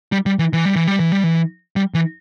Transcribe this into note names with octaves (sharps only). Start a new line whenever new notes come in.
G3
G3
E3
E3
G3
E3
G3
E3
G3
E3
G3
E3